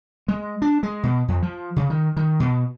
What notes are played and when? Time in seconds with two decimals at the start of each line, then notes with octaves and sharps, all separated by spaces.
0.28 G#3
0.62 D4
0.83 G#3
1.03 B2
1.28 F2
1.42 F3
1.76 C#3
1.90 D#3
2.17 D#3
2.40 B2